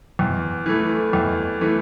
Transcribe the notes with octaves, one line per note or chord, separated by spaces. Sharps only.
E2
E3 A3
E2
E3 A3